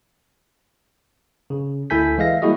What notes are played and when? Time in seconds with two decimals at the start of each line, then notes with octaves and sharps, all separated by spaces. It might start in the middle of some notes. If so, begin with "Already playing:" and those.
1.50 C#3
1.90 D2 E4 A4 G#5 G6 B6
2.18 E3 G#3 E5 F5 A#6
2.42 G3 A#3 E4 F#4 G#4 D#5